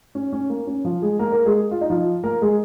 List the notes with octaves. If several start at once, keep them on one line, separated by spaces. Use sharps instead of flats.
C#4
C#4
A#3
C#4
F3 F4
G#3 G#4
A#3 A#4
A#3 A#4
G#3 G#4
F4
D#4
F3 F4
A#3 A#4
G#3 G#4